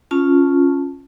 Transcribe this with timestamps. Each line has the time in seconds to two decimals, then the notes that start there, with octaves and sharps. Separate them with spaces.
0.11 C#4 F4 A5